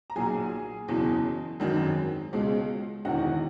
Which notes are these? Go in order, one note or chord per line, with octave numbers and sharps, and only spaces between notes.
A#5
B1 A#2 F#3 G#4 G#5
F#1 E2 B2 F#3
G#1 F#2 D#3 F#3
C#2 B2 G#3
E1 E2 D#3 F#4 F#5